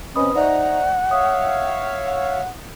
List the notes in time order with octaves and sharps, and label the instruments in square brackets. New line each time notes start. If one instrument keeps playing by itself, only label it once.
[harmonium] C3 C#4 [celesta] B4 B5 D#6 [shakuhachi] D#5
[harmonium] D#4 A#5 [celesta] C5 D5 E5 [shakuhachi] F#5
[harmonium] C#5 E5 F5 [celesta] D#6
[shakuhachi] F#5